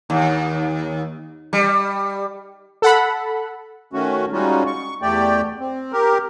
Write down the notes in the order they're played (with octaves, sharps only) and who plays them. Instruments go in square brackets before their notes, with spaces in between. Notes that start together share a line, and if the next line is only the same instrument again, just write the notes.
[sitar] D#2
G3
[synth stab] A4 F#5 B5
[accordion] D#3 A3 C#4 F#4
G3 G#3 C#4 D#4 F4 F#4
C#6
E2 A3 G4 D5 G5
C4
G4 A#4